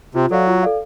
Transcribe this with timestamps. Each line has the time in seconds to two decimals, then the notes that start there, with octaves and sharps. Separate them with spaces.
0.15 C3 F4
0.31 F#3 A4 D5 F5
0.47 F4
0.63 A4 D5 F5